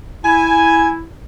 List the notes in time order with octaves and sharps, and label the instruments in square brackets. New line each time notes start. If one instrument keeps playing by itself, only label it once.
[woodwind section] E4 [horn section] G#5